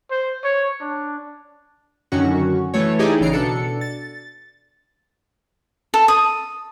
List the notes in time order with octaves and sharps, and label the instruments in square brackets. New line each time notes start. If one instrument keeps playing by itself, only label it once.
[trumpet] C5
C#5
D4
[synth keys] F#2 D3 D#3 C#4 F#4 C#6
E3 A3 C#5
D#4 E4 G4 G#4 D5
A1 C#3 E3 A#5 C7 D7
B2 D4 A4 C#7
A6
[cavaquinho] A4
D#6